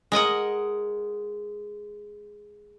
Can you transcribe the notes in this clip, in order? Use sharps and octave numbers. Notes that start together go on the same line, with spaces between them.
G#3 A#4 D#5 F#5